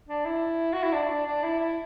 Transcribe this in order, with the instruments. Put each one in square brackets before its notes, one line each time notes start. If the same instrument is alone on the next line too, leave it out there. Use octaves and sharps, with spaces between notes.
[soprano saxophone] D4
E4
F#4
E4
D4
D4
D4
E4
E4